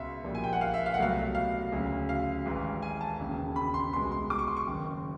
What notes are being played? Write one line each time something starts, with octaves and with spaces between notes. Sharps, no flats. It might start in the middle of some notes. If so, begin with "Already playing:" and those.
Already playing: C#2 B2 G#3 E5 F5
A#1 A#2 G3
G#5
G5
F#5
F5
E5
F5
F#5
C2 B2 F#3 A3 F5
F5
D2 C#3 F#3
F5
G#1 G#2 E3
G#5
A5
E1 D#2 C#3
B5
C6
C2 B2 G#3 C6
C6
D6
C#6
C6
C#6
F#1 F#2 D#3